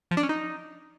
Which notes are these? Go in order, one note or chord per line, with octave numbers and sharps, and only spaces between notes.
F3
D4
C#4
D#4